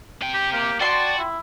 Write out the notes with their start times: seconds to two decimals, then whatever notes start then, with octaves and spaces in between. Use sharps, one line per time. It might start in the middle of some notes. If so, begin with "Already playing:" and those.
0.22 C3 G5
0.34 G4
0.52 A#3 G4
0.80 F#4 D5 G5 A5 C6
1.18 E4